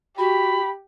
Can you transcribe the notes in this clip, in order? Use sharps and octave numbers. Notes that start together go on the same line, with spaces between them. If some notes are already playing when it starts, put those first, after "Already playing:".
F#4 G4 B5